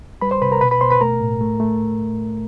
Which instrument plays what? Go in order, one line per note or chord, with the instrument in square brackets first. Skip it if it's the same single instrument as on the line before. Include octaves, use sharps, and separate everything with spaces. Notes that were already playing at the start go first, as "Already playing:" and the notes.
[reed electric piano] G3 B4 B5
C5 C6
C3 B4 B5
A#4 A#5
B2 B4 B5
B4 B5
B2 C5 C6
B4 B5
A3 A#4 A#5
A2
A3
A3